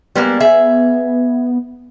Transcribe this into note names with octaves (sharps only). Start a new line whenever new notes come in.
G3 G#3 A#3 B3
G#4 E5